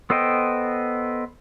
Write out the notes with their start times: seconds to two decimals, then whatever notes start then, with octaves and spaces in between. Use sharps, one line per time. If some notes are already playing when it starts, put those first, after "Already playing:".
0.10 B3 A4 C5 D#5 G5